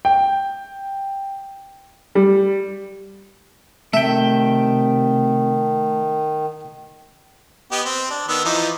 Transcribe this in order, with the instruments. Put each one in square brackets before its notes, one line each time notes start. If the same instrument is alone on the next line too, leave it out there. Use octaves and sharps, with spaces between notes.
[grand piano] G5
G3
[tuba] C3 [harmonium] D#3 [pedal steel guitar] A3 G5 [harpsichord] E5
[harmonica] B3 G4 D#5
C4
D4
D#3 B3 E6
E3 F3 D#4